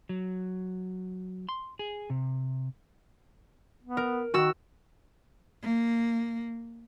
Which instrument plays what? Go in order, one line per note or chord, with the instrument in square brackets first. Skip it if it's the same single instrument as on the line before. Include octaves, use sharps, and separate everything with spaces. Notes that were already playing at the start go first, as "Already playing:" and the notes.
[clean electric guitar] F#3
C6
G#4
C3
[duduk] B3
[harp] A#4
[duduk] D#3 [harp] F#4 E6
[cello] A#3